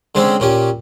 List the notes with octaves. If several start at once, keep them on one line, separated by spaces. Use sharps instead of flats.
D3 G#3 C4 C#4
A#2 C#4 G4